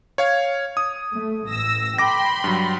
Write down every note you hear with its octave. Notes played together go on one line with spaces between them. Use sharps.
C#5 F5 G#6
D#6
A3
A1 E6 A#6
G5 B5 C6 D6 A#6
G2 F#3